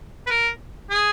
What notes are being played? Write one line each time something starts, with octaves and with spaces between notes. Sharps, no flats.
B4
A#4
G#4